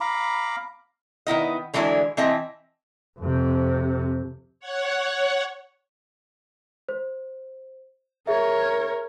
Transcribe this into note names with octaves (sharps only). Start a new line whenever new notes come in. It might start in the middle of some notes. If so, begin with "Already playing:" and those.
F5 A#5 B5 D6
D#3 B3 E4 D#5
D3 E3 F#3 G#3 D4 E4
E3 C4 D#5 E5 A5
F2 C3
C#5 F#5
C5
G#4 A#4 C#5 E5